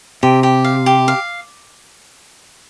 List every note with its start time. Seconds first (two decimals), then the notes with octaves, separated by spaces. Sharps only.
0.23 C3 G4
0.43 G4
0.64 F5
0.86 G4
1.08 F5